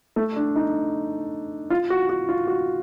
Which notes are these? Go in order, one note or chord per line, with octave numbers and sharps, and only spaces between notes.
A3
D4
D#4
F4
F#4
F#4
F4
F#4